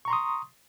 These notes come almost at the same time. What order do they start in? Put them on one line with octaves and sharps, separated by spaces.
C#6 A#5 C6 D#6